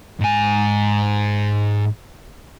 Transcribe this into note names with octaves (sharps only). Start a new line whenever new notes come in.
G#2 G#5